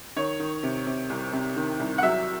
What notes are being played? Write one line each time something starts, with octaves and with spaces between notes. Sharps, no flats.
D#3 C#5
D#3
C3
C3
C2
C3
D#3
C2
F#5
F#3 E5